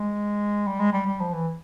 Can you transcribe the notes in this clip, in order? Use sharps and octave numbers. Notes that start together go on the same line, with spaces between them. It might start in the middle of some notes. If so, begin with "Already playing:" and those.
Already playing: G#3
G3
G#3
G3
G3
F3
E3